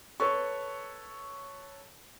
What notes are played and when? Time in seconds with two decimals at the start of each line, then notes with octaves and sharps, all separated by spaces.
0.20 A4 B4 C#5 C#6